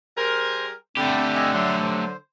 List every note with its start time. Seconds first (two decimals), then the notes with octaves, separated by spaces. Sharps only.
0.18 G3 G#4 A#4 C5
0.97 D3 A3 C4 G4 B5
1.35 D#5 E5 G#5
1.54 F#3 E5 F#5 C6
1.82 C5